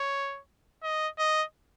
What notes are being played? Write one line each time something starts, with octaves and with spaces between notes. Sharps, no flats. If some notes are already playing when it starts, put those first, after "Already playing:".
Already playing: C#5
D#5
D#5